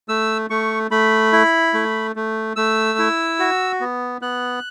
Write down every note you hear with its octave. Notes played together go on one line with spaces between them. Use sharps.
A3 E6
A3 C#6
A3 B5
E4
A3
A3
A3 E6
E4
F#4
B3
B3 F#6